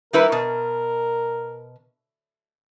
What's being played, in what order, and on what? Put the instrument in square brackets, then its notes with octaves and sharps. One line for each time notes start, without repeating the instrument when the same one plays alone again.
[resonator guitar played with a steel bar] G3 E4 B4 [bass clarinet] A#4
[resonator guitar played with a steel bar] B2